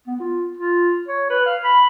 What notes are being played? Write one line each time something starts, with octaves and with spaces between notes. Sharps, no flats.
B3
F4
F4
C#5
B4
F5
B5